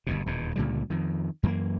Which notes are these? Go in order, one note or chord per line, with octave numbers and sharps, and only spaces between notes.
G1 D#2 B2
D#1 E2 B2
C#2 A#2 D3 G3
F2 D#3
F#2 E3 A3 A#3